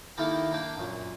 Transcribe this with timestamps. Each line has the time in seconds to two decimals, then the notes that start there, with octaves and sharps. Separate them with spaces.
0.17 D#3 A#3 E4 G4 A4 A#4
0.52 A#3 D4 G5
0.78 F#2 A#2